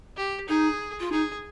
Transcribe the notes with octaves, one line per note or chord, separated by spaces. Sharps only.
G4
D#4 G#4
F4
D#4 G#4